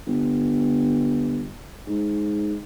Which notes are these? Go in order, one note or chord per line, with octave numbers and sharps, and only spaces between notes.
G1
G#2